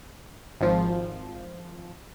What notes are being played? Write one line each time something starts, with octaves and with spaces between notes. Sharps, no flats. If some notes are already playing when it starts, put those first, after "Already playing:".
G#1 F3